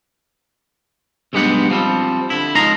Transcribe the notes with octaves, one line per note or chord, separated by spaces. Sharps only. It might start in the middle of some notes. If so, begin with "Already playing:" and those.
B1 G2 G#3 B3 G4 F#5
F3 G3 C4
D3 E4
C#2 F3 D#4 A#5 C6